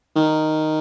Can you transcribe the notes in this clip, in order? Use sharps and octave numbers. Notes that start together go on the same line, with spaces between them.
D#3